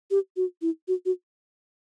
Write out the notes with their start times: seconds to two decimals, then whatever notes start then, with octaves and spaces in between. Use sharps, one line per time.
0.11 G4
0.37 F#4
0.62 E4
0.88 F#4
1.05 F#4